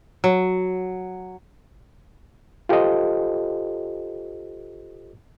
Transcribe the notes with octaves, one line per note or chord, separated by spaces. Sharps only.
F#3
F4 G4 A4 C5 D#5